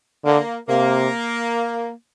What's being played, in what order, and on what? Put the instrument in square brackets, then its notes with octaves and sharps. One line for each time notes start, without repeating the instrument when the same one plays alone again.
[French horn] D3 [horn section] A#3
[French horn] C3 [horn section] A#3